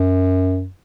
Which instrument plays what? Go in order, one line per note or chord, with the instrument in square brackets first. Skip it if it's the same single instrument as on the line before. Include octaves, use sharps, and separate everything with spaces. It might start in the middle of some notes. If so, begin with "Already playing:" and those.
Already playing: [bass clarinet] F#2